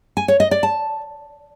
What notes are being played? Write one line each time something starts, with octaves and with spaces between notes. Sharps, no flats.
G#5
C#5
D#5
D5
A5